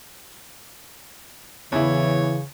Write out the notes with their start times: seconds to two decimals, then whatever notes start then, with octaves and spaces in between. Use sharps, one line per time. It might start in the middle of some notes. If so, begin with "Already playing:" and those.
1.72 E2 C#3 E3 E4 C#5